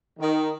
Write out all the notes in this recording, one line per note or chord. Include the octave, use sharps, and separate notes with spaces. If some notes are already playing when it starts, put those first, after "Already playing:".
D#3